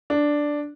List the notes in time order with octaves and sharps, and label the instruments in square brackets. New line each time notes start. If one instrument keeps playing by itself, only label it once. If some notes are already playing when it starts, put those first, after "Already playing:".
[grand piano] D4